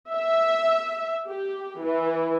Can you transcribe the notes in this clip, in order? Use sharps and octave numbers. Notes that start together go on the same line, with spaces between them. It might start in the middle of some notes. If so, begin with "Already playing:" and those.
E5
G4
E3